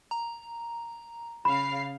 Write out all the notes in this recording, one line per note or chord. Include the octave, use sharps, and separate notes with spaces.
A#5
C#3 F5 B5 C7